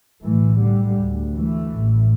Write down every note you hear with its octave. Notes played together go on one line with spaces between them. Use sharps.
B1 A2 E3 A3
D3 G3
D2
E3 A3
A1 A2